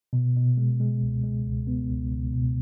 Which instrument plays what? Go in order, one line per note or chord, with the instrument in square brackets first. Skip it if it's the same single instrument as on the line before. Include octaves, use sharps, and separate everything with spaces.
[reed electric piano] B2
B2
G#3
G#3
C#2
G#3
C#2
B3
C#2
C#2
B2